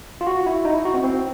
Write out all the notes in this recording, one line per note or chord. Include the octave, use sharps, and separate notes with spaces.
F4
F#4
E4
D#4
E4
F#4
C4
C4